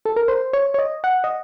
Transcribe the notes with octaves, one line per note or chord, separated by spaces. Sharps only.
A4
A#4
C5
C#5
C#5
D#5
F#5
D#5